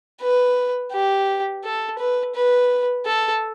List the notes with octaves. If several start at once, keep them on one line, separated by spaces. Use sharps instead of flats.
B4
G4
A4
B4
B4
A4